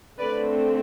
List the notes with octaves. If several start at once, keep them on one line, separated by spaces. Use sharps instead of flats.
D3 A3 C4 B4 D5